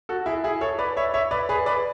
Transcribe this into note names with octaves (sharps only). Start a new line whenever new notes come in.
F#4 A4
E4 G#4
E4 G#4
A4 C#5
B4 D5
C#5 E5
C#5 E5
B4 D5
G#4 B4
B4 D5